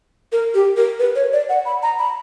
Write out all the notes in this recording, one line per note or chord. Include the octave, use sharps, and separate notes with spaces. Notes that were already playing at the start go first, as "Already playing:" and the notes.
A#4
G4
A#4
B4
C#5
D5
F#5
B5
A#5
B5